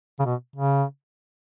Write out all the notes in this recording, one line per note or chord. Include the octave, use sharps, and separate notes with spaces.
C#3
B2
C#3